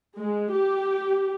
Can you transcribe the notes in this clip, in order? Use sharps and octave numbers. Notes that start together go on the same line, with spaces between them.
G#3
G4